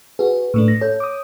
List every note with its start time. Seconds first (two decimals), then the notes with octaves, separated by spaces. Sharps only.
0.19 F#4 G#4 B4
0.54 A2 A3 D4
0.68 A#6
0.81 A4 C#5 G6
1.00 D6 D#6